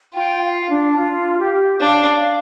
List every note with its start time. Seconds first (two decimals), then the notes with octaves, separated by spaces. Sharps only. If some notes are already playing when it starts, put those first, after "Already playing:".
0.14 F4 G5
0.43 F5
0.70 D4
0.97 F4
1.39 G4
1.80 D4 F5
2.22 F5